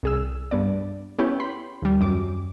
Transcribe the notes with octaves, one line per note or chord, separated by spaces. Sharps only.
C2 G#4 E6
G2 B3 D5
B3 C#4 E4 G4 G5
B5 C6
D#2 G3
F#2 D6